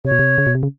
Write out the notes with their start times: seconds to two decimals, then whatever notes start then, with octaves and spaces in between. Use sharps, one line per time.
0.05 C3 C#5
0.11 B2
0.19 C3
0.38 C#3
0.47 B2
0.55 C3
0.63 C#3